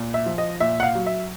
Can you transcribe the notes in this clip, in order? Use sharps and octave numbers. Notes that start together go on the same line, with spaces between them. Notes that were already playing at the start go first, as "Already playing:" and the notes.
Already playing: A#2
E5
F3
D#5
A#2 E5
F#5
F5
F#3
E5